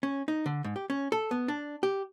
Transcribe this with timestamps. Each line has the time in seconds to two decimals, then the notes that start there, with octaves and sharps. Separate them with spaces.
0.03 C#4
0.28 D#4
0.46 D3
0.64 G#2
0.76 G4
0.90 C#4
1.12 A4
1.31 B3
1.48 D4
1.83 G4